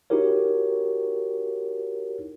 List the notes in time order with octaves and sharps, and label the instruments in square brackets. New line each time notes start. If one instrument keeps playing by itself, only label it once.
[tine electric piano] D#4 E4 F#4 G4 A#4 C#5